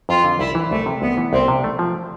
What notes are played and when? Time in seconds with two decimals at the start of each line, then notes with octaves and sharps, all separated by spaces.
0.09 F2 F4
0.24 D3
0.39 C2 E4
0.55 E3
0.71 C2 A3
0.86 C3
1.02 C2 B3
1.18 E3
1.33 C2 C4
1.48 C3
1.64 A3
1.79 F3